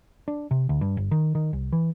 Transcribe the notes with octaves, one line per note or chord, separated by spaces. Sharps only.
D4
C3
D2
G2
G1
D#3
D#3
C2
E3